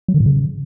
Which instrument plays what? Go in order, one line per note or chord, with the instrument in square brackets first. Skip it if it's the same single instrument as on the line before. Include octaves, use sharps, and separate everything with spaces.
[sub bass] F#3
D3
A2
C#3